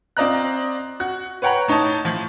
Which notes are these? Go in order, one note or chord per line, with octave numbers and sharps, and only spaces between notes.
C4 F4 D5 D#5 A#5 F#6
F#4 F#6
B4 C#5 F#5 G5 A#5 B5
A2 D#4 C#5 A5
A2 F3